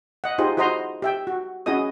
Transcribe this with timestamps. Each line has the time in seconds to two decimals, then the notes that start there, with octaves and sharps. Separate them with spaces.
0.24 D#5 F#5
0.38 D#4 F4 G4 G#4 C5 D#5
0.57 E4 F#4 C5 D#5 A#5 C6
1.02 G4 E5 G5
1.27 F#4
1.66 C#4 E4 F#4 G#4 D#5 D#6